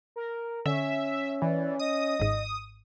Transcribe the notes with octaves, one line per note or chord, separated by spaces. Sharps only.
A#4
D3 C#4 E5
E3 D5
D#5 D#6
G#1 G#2